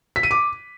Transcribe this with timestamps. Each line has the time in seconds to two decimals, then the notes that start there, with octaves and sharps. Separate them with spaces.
0.16 B6
0.23 D#7
0.31 D6